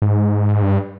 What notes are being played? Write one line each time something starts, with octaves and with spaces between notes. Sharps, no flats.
G#2
G2